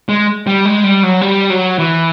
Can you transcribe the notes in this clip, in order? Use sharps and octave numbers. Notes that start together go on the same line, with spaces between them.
G#3
G3
G#3
G3
F#3
G3
F#3
E3